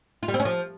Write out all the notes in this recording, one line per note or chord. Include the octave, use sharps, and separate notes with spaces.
F4
G3
C4
C#4
F3